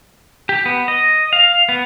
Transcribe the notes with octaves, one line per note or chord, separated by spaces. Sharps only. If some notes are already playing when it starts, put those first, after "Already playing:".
G4
B3
D#5
F5
B3